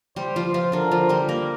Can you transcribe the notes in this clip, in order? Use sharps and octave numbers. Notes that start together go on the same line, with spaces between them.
G3 G4 C5
F3 F4
F3 F4
D3 D4 A#4
F3 F4
G3 G4
A#3 A#4